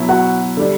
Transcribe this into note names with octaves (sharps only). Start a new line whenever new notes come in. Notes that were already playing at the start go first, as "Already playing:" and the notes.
Already playing: B2 F#3 B3 E4
F#4 F#5
D3 G3 D4